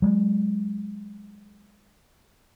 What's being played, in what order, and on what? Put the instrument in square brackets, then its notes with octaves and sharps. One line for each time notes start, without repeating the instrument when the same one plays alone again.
[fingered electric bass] F#3 G#3